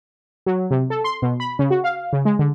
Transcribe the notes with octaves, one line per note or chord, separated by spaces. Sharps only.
F#3
C3
A4
C6
B2
B5
C#3
F#4
F5
C#3
G#3
D3